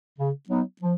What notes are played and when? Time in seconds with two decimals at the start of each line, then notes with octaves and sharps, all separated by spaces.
0.18 C#3
0.50 F#3 B3 D#4
0.82 F3